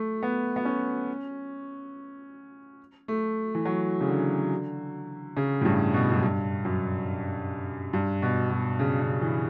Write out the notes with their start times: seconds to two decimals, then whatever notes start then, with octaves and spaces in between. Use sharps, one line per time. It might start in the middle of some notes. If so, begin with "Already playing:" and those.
Already playing: A3
0.23 B3
0.56 B3
0.65 C#4
3.08 A3
3.55 E3
3.65 F#3
4.01 C#3
4.08 D3
5.37 C#3
5.61 A2
5.65 G2
5.94 B2
6.12 F#2
6.22 G2
6.65 F#2
7.93 G2
8.22 B2
8.51 B2
8.79 C#3
9.01 C#3
9.22 E3